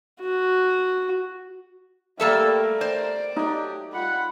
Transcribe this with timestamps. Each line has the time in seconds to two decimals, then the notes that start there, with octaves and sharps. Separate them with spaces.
0.21 F#4
2.20 G3 A3 A#3 A4 A#4 E5
2.81 C5 D5
3.36 F#3 A3 D#4 G4
3.93 G3 F4 F#5 B5